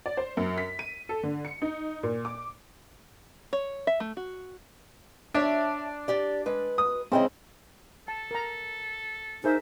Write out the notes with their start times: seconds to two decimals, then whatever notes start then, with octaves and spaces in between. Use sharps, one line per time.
0.06 D5
0.17 C5
0.37 F#2
0.58 B6
0.79 D#7
1.09 A4
1.23 D3
1.45 C#7
1.62 D#4
2.03 A#2
2.25 D6
3.53 C#5
3.87 E5
4.00 A3
4.17 F#4
5.34 D4 C#5 E5 A5
6.08 G4 D5
6.46 G#3 B4
6.78 D#6
7.12 C#3 C4 E4 C5 D#5
8.08 A4 A5
8.31 A#4 A#5
9.44 D#4 G#4 A#4 C5 E5